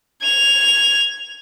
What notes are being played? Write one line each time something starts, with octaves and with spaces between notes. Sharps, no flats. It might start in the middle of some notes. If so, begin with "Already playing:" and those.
G#6 F7